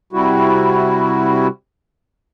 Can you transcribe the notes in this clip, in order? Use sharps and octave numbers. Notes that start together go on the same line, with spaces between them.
C3 G3 E4 F#4